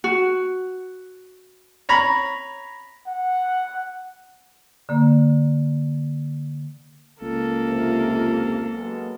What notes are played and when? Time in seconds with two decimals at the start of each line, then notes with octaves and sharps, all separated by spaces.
0.04 F#4
1.89 C#5 A#5 B5
3.07 F#5
4.89 D3 A#3
7.22 C#2 A#3 A4
7.61 F2 C3
8.72 F#3 G#3 B3